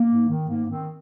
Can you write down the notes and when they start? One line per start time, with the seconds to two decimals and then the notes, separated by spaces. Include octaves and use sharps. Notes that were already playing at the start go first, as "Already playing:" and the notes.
Already playing: A#3
0.08 G#2
0.29 D#3
0.48 G#2 A#3
0.69 D#3 C4